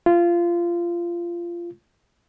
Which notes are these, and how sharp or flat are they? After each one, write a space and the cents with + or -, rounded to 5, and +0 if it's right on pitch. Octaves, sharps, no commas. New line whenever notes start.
F4 -20